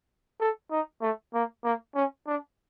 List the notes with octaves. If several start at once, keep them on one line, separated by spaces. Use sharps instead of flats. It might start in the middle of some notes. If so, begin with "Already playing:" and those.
A4
D#4
A3
A#3
A#3
C#4
D4